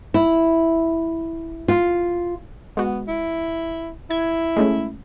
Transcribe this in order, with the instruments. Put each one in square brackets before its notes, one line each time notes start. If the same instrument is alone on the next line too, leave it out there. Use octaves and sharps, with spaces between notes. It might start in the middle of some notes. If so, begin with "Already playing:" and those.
[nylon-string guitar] E4
F4
[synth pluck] G#3 F#4 [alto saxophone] B3
[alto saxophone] E4
[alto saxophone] E4 [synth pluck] G#6
[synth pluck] G#3 A3 C#4